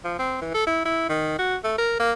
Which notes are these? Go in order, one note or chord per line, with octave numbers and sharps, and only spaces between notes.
F3
C4
E3
A4
E4
E4
D#3
F#4
A3
A#4
A#3